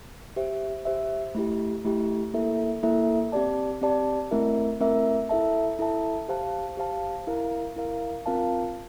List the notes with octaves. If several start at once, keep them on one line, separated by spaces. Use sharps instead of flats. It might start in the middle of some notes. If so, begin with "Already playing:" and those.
G4 C5 E5
G4 C5 E5
A3 E4 G4
A3 E4 G4
A#3 E4 A4 E5
A#3 E4 A4 E5
C4 G4 D5 A5
C4 G4 D5 A5
A3 C4 E4 A#4 E5
A3 C4 E4 A#4 E5
E4 A4 E5 A5
E4 A4 E5 A5
G4 C5 F5 A5
G4 C5 F5 A5
E4 A#4 F5
E4 A#4 F5
C4 F4 A#4 F5 A5